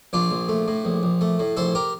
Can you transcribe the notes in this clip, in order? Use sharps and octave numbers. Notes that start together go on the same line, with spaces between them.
A#1 D4 F4
A#1
A3
A2
A#1
A#1
A3
A2
A#1 A4 C5
G4 A#4